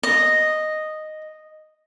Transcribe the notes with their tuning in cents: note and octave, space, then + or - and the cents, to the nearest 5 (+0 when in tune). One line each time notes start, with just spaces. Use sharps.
D#5 -5